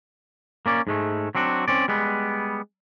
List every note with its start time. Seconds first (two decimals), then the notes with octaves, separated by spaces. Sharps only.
0.66 A#3 C#4 D5
0.87 G#2 G#3 A3
1.35 F#3 C4 D4 F#4
1.68 C4 C#4 D5
1.88 G3 G#3 B3